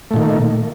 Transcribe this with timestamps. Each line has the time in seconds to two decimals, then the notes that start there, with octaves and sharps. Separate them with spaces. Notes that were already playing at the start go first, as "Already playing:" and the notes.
0.11 A3
0.14 A#2
0.16 D#3